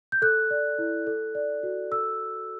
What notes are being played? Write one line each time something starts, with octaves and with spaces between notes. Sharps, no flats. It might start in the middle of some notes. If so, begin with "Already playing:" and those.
G6
A4 F#6
D5
E4
A4
D5
F#4
A4 E6